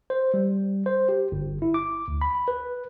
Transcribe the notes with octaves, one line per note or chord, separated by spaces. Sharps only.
C5
G3
C5
G4
G1
E4
D6
D2
B5
B4